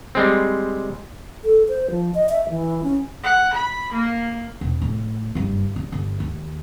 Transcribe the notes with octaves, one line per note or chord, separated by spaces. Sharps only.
G3 G#3 C4
A4
C5
F3
D#5
E5
E3
C#4
F#5
B5
A#3
E1
A2
F#1 G2
G2
G1
D#2